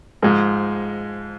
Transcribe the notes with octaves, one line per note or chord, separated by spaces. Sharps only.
G#2 F3 G#3